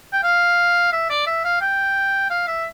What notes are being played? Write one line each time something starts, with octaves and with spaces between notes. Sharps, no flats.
G5
F5
E5
D5
E5
F5
G5
F5
E5